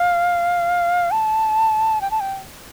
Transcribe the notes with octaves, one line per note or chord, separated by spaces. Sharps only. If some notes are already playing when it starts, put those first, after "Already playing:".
Already playing: F5
A5
G5
A5
G5